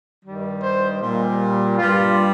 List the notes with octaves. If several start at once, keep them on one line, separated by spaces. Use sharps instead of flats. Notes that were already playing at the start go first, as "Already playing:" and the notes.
G2 D#3 G3
C5
A#2 G3
G2 G3 F4